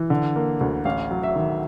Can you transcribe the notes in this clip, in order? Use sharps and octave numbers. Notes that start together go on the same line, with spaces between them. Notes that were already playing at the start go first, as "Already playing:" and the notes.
Already playing: E3
D3
A#3
D2
A1 F5
F#3
E5
D#3